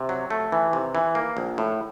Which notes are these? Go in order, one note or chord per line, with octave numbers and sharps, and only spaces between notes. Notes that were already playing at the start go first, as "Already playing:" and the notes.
Already playing: C3
F#3
A3
E3
C3
E3
A#3
A#1
A2